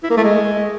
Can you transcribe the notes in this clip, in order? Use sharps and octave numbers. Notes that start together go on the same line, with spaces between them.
E4
A#3
A3
G#3